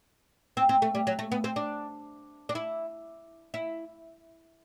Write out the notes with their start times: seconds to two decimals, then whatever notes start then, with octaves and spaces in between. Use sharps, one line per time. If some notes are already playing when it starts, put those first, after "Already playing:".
0.57 C4
0.69 C4
0.82 A3
0.95 G3
1.07 F#3
1.19 A3
1.32 B3
1.44 C4
1.56 D4
2.49 D4
2.55 E4
3.54 E4